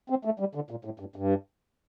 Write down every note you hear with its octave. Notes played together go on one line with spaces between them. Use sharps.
C4
A3
G3
D3
A#2
A2
G2
G2